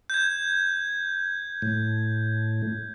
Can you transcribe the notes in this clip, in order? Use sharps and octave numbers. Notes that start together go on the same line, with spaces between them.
G6 G#6
A2